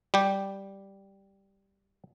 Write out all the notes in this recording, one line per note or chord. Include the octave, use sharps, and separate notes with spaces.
G3 G4